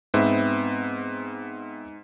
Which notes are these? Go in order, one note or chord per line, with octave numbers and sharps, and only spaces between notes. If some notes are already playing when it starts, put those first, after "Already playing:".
G#2 B3 C4 E5